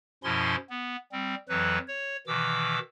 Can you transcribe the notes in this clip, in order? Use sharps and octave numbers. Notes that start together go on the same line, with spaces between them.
F#2 B2 F3 C#4 E4 C6
B3
G3 C4
F2 E3 F#3 B4
C#5
B2 D#3 E3 D6 E6